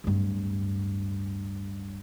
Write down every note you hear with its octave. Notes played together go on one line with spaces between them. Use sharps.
D1 G2